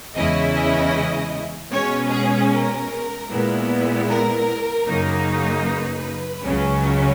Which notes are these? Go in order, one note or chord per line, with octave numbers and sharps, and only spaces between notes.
E2 C#3 G#3 C#4 E4 D#5
D#5
B2 G#3 C#4 C#5
G#4
A#4
A#2 G#3 B3 E4
A#4
F#2 C#3 F#3 A#3 D#4
B4
C#2 C#3 F#3 C#4